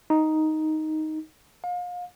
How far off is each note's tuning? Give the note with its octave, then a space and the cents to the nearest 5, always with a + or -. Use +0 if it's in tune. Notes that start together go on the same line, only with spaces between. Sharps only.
D#4 +5
F5 +35